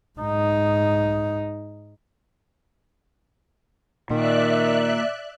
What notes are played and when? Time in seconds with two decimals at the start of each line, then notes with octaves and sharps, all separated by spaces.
0.19 G#2 D#4
4.10 A#2 D#3 D5 E5 F#6